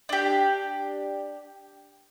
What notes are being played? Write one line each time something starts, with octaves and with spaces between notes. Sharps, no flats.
D4 G4